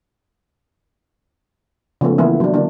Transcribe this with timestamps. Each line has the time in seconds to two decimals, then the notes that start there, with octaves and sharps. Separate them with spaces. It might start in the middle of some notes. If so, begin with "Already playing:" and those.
2.01 C#3 F3 G#3 A3 B3 C#4
2.18 E3 A#3 B3 E4
2.40 F#3 D4
2.54 D3 A#3 D4